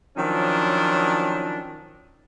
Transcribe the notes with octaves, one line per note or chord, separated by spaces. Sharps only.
D#3 F3 F#3 C#4 D4